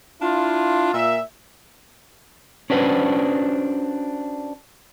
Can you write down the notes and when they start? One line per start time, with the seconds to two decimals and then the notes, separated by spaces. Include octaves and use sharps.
0.22 D4 E4 F4
0.94 A#2 E5
2.70 C#4 D4 F#4 B4 C5